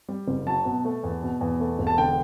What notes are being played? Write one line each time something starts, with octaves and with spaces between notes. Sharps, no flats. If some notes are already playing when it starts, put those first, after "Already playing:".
G3
F#1
F#3 A5
B2
A3
E2
B2
E2
A3
E1
A5
D3 G5